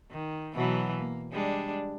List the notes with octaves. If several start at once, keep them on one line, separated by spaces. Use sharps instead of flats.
D#3
B2 E3 F#3
A#3
G3 G#3 D4